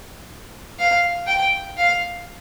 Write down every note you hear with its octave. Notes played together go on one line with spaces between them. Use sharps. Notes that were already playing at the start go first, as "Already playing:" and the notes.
F5
G5
F5